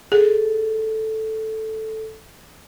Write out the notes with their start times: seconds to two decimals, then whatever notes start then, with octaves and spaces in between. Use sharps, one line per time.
0.12 G#4 A4